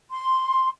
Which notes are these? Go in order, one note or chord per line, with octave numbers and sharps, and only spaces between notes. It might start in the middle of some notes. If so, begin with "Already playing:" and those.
C6